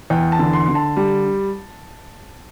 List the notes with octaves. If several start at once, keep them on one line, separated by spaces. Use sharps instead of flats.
E2 G5
A5
D3
C6
D3
A5
G3